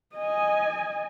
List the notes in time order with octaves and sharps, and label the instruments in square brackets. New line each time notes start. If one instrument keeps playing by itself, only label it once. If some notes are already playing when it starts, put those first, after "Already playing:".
[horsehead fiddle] D#5 G#5